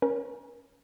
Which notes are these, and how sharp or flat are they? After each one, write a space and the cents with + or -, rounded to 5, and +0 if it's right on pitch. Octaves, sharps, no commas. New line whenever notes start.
C#4 +0 A#4 +40